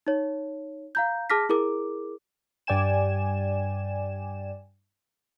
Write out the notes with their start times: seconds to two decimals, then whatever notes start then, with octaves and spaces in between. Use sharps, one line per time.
0.07 D#4 C#5
0.95 F5 A#5 G6
1.30 G#4 A5 D6 F6 A#6 B6
1.49 E4 G#4 A#4 D6
2.67 G2 D5 G5 G#5 E7